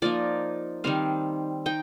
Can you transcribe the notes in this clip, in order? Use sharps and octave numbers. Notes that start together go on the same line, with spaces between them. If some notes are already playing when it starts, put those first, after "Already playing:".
F3 A#3 D#4 D5
D#3 G3 C4 F5
D#4 G5